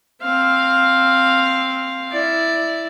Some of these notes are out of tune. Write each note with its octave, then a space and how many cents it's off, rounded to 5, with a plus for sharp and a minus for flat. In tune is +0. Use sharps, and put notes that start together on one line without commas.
C4 +10 F5 +0
E4 +0 D5 +0